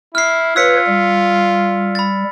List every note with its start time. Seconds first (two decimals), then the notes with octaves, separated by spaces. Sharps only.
0.15 E4 F6 C7
0.56 F4 B4 C#5 E6 B6 C#7
0.87 G3
1.95 B5 A6